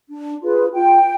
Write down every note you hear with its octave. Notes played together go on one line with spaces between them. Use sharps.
D4
F4 G#4 B4
F4 G5